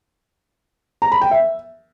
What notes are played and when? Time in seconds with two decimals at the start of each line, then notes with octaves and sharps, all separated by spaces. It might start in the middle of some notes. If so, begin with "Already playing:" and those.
1.02 A#5
1.12 B5
1.21 G5
1.31 E5